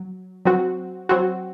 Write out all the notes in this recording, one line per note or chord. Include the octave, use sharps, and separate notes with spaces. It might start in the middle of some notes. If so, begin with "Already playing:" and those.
Already playing: F#3
F#3 C4 F#4
F#3 C4 F#4